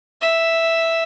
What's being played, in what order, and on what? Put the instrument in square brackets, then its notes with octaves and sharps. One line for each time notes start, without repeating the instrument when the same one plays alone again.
[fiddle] E5